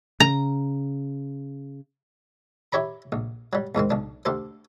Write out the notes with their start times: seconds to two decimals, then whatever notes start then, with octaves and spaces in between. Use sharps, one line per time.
0.20 C#3 A#5
2.72 E4 G4 C#5 A#5 B5
3.12 A#1
3.53 F#3 G3
3.75 E2 G#2 D#3 C4
3.90 B1 D4
4.25 D2 G4 A4 C5